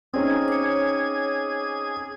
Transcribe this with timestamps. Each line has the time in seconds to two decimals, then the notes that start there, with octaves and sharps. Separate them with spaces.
0.13 C4 C#4 D#4 G#4 G#6
0.48 C#5 D6